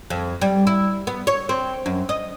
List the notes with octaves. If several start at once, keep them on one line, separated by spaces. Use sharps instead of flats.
F2
G3
E4
B3
C#5
C4
F#2
D#5